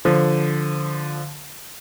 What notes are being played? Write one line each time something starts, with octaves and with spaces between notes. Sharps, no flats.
D3 F3